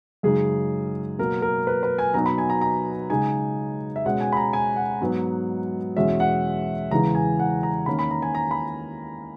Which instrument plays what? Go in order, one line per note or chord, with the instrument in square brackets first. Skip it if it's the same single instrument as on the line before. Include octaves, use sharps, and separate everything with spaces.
[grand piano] F#2 C#3 G#3 D#4 G#4
B2 F#3 A#3 A#4
A#4
B4
B4
G#5
B2 F#3 B3 D#4 A#5
B5
G#5
A#5
A#5
C#3 G#3 D#4 G#5
E5
B2 G#3 C#4 F#5
G#5
B5
A#5
G#5
F#5
G#2 F#3 B3 D#4
E2 B2 G#3 C#4 E5
F#5
E2 C#3 E3 G#3 A#5
G#5
F#5
A#5
D#3 A#3 C#4 B5
B5
A#5
G#5
A#5
B5